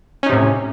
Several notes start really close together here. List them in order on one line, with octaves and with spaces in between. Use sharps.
C#4 D#4 C3 A2